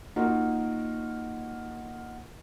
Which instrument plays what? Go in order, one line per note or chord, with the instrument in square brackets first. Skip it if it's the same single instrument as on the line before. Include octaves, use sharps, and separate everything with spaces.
[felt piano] A#3 D#4 F4 F#4 A#4